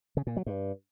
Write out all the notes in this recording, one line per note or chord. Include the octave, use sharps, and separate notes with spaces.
C#3
A#2
F#3
G2